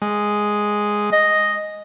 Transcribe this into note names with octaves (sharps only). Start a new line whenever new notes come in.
G#3
D#5